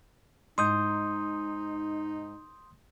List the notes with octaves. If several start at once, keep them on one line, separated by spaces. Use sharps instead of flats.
G#2 D#4 C6 D#6 G6